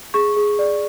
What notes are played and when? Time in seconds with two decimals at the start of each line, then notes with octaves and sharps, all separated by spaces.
0.14 G#4 C#6
0.36 G#4
0.59 D5